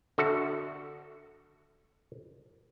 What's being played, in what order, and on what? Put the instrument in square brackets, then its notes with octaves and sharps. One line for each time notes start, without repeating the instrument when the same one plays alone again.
[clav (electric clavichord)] D3 F#4 A4 E5